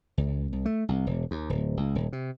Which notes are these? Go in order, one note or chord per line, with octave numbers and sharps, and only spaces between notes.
C#2
C2
A3
C2
E1
D#2
D1
C#2
D#1
C3